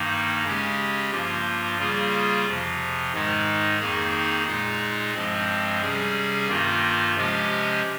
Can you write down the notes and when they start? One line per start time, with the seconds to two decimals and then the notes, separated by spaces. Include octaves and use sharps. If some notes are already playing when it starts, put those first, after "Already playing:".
Already playing: G2 D#3 A#3 D#4
0.44 C#3 G#3 C#4 G4
1.11 G2 F3 A#3 F4
1.78 C#3 G3 A#3 F4 G#4
2.46 F2 C3 F3
3.13 G#2 D#3 G#3 D#4
3.80 F2 D#3 A#3 D#4 G#4
4.47 A#2 G#3 D#4 G#4
5.13 G2 F3 G#3 C4
5.81 C3 G3 C#4 G#4
6.48 G2 D#3 A#3 F4
7.15 C3 F3 G#3 C#4 G4